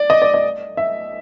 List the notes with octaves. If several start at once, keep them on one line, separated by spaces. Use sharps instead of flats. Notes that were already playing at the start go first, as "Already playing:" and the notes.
Already playing: D5
D#5
D5
D#5
E5